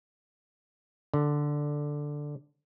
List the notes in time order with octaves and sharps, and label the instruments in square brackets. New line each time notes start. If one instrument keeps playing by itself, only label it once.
[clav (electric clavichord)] D3